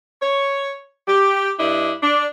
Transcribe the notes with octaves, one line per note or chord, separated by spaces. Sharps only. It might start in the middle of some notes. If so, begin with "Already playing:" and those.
C#5
G4
G2 D4 E4 D#5
D4